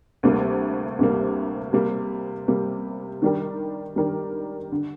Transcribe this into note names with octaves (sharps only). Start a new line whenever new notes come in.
D2 C3 G3 A#3
D2 C3 G3 A#3
C3 G3 A#3
C3 G3 A#3
D#3 G3 D4 G4 A#4
D#3 G3 D4 G4 A#4
D3